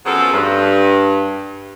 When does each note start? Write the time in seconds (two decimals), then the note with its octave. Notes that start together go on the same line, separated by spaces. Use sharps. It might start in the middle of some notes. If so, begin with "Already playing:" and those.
0.05 F#2 F3 B3 C4 G#4 A4
0.33 G2